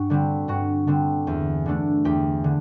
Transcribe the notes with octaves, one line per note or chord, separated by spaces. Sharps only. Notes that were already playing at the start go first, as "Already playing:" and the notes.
Already playing: G2 F#4
D3 G3 C4
G2 F#4
D3 G3 C4
E2
D3 A3 D4
E2 G4
D3